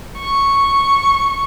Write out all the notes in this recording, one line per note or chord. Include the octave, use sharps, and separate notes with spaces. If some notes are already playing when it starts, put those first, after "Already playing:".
C#6